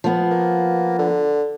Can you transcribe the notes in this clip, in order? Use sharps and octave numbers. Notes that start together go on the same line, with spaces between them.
F3 B3
A#3
D3